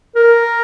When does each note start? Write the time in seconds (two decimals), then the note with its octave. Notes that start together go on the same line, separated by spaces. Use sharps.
0.15 A#4